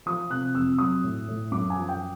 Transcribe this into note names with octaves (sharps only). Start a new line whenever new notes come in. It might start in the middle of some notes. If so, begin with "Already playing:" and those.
F3 D#6
C3 F#6
F2 E6
F#3 D#6
A2
A2
F#2 D6
G#5
F3
G5